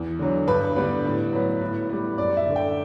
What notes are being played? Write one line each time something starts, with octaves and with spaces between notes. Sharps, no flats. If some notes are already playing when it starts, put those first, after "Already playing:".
Already playing: E2
D3 F#3
G2 B4
D3 G3 B3
A2
F#3 B3
A2
G3 B3
F#2 D5
E5
D3 A3
G5